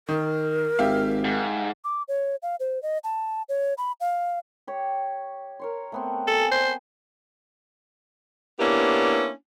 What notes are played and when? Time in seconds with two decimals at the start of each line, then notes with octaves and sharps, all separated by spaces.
0.09 D#3 A#4
0.79 G#1 G4 E5 F5
1.25 G#2
1.84 D6
2.08 C#5
2.43 F5
2.60 C5
2.83 D#5
3.04 A5
3.49 C#5
3.78 B5
4.01 F5
4.67 G4 C#5
5.59 A#4 C#5 C6
5.92 A3 B3 C4
6.28 A4 G#5
6.52 C5
8.60 A#3 B3 C#4 D4 E4 G4